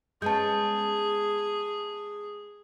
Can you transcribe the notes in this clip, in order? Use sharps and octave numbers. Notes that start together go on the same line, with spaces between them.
G#3 B3 C#4 G#4 A5 G6